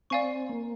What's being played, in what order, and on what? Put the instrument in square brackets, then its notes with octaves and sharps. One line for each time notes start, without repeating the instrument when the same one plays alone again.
[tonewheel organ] C4 [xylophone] D5 F5 G#5 C#6
[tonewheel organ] A#3